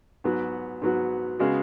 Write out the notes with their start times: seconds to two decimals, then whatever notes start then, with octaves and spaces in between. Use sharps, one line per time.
0.24 G#2 F#3 B3 F#4
0.82 G#2 F#3 B3 F#4
1.39 C#3 G#3 B3 F#4